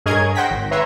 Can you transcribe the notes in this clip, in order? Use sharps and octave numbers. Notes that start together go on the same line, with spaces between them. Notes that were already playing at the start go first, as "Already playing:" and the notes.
G2 G#4 A#4 C#5 D#5 G#6
C5 F#5 G5 A#6 B6
G#1
B4 C#5 E5 A#5 C6